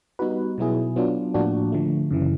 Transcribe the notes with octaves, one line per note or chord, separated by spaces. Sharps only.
G3 B3 D#4 F#4 B4
B2 F#3 B3 E4 G#4
F#3 B3 D4 F4
A2 F3 A#3 D4 F#4
D3 F3 A3
F#2 C#3 E3